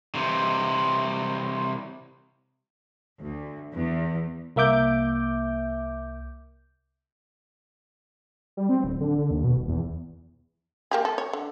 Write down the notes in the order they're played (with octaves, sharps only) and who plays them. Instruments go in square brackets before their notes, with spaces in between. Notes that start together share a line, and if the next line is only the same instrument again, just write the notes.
[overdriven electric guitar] C3 E3
[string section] D2
E2
[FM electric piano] C2 A#3 E5 D6 G6
[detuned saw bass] G3
C4
D1
D3
D3
D#2
B2
D#1
E2
[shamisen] A#3 G4 G#4
A4
C#5
D3